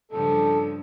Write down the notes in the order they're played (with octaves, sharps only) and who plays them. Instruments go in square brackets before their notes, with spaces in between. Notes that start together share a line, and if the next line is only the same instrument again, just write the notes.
[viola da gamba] G2 C#3 F3 [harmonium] A4